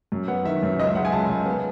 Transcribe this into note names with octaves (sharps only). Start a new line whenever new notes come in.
F#2
B3 F#5
D#3 E5
F#2
C#2 D#5
E5
G#3 F#5
G#5
C#2 A5
C#2
B3